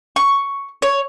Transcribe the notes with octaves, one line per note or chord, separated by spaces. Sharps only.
C#6
C#5